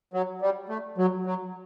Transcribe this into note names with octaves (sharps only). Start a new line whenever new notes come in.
F#3
G3
A3
F#3
F#3